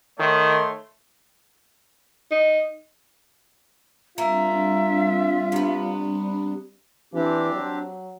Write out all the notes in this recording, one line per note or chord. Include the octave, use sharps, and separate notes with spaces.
D#3 A3 C#5 C6
D#4
G3 A#3 C4 D4 F4 E5
C3 B3
E3 C4 D4 G4
F#3